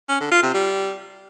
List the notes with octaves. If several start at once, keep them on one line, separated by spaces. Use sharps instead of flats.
C#4
D3
F4
C3
G3